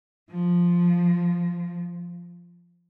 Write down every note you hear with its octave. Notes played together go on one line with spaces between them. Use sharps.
F3